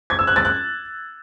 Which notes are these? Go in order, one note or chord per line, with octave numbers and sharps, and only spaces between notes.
G#6
E6
F#6
A6
F#6